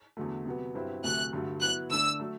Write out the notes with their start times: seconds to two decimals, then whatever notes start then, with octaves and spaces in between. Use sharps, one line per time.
0.17 E2 D3 F#3 A3
0.46 C3 F#3 B3
0.75 G2 F#3 C4 E4 B4
1.03 D2 C3 F#3 A3 F#6
1.33 G2 D3 F#3 A3
1.61 F#3 B3 E4 F#6
1.90 D3 A3 D4 E6
2.20 F#3 A3